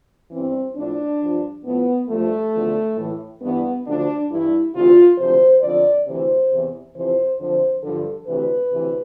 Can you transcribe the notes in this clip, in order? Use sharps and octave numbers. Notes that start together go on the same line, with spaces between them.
G2 E3 C4
A2 F3 D4
G2 F3
A2 F3 B3
G2 F3 A3
E2 D3 F3
A2 E3
G2 E3 B3
D2 D3 F3 D4
G2 E3 E4
D2 C3 E3 F4
D2 C3 F3 C5
F2 D3 F3 D5
D2 C3 E3 C5
E2 C3 E3
F2 C3 E3 C5
F2 D3 F3 C5
G2 D3 F3 A4
D2 C3 E3 B4
D2 C3 E3